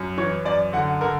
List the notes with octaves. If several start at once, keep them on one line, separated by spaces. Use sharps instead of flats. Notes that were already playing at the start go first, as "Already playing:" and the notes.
Already playing: F#2
E3 C#5
F#2 D5
D3 F#5
D3 A#4